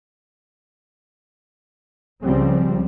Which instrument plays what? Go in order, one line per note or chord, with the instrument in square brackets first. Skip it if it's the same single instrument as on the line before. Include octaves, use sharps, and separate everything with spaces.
[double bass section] C#2 C#3 F3 G3 C4